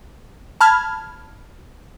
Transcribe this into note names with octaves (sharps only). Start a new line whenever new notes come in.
A5 B5 F6 G#6